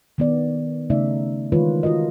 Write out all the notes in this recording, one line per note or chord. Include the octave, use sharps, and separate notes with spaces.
D#3 B3 D5
C#3 A3 C#4 D#4 D5 E5
D#3 E3 G#3 F4 B4 C#5
F4 F#4 A#4 D#5